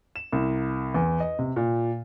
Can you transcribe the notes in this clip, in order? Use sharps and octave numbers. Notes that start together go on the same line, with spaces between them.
E7
C2
E2
D#5
C3
A#2